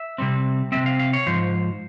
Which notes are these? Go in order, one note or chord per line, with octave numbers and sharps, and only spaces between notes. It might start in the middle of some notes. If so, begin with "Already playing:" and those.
Already playing: E5
C3 G3 C4
C3 G3 C4 E5
F5
F5
C#5
G#2 F3 C5